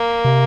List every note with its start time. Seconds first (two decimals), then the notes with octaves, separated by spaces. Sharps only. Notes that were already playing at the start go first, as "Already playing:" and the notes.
Already playing: A#3
0.25 C3